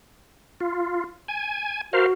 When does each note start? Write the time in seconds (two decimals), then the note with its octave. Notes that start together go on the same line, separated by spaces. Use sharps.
0.60 F4
1.28 G#5
1.93 F#4 A#4 C5 F5